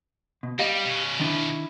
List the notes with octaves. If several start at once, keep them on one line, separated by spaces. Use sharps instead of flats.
B2
G3 G4 D#5 F5
B2 C#4
D#3 D4 E4